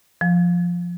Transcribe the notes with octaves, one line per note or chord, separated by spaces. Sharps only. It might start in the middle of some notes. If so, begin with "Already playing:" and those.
F3